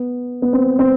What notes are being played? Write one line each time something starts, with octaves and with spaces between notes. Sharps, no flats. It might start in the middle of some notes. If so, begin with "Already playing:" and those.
Already playing: B3
B3
C4
C4